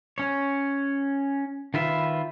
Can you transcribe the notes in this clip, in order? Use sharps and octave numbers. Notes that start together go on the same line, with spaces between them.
C#4 C#5
D#3 F4 B4 E5